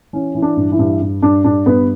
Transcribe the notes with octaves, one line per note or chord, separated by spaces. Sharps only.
E3 C#4
E3
D4
G2
E3 E4
G2
G2
G2 D4
G2 D4
G2 B3 B4